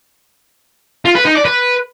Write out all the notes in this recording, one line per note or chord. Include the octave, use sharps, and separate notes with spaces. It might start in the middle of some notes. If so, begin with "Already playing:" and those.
F4
B4
D#4
D5
B4